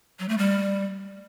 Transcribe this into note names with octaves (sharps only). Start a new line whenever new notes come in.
F#3
A3
G3